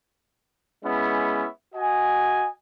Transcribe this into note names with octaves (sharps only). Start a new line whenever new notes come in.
G#3 B3 C#4 E4
F#4 D#5 G#5